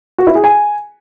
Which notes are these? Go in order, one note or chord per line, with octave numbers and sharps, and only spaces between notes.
F#4
E4
G#4
G#5